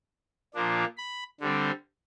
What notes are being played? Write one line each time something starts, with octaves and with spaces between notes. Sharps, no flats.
A#2 F3 A#3 D4
B5
D3 G3 C4